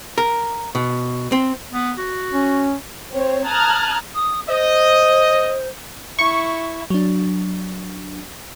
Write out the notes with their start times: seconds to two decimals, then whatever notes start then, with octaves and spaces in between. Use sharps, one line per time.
0.18 A#4
0.75 B2
1.32 C4
1.73 B3
1.98 F#4
2.32 C#4
3.09 C4 C#5
3.46 A5 A#5 D#6 F6 F#6 G#6
4.14 D#6
4.48 C5 D#5
6.19 E4 C#6
6.90 F#3 D4